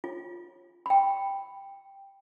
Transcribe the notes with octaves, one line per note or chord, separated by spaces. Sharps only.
F4
G5 B5